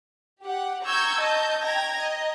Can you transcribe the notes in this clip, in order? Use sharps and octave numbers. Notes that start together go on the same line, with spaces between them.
G4 F#5
A#5 C#6 E6 G6 G#6
D#5 A5 G6
G5 A#5 G#6 A#6
D#5